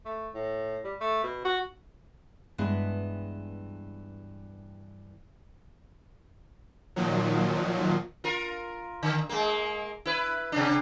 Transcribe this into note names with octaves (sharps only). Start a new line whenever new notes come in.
A3
A2
G3
A3
B2
F#4
G2 E3 G#3 B3 E4
A#2 D#3 F3 F#3
F4 A#4
D3
G#3 A#3
E4 B4
C3 D4